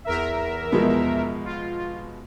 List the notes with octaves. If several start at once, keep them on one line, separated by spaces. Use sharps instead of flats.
E2 A#4 E5
B2 F3 G#3
F4